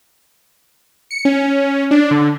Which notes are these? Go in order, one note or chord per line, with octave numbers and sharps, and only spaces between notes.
C#7
C#4
D4
D3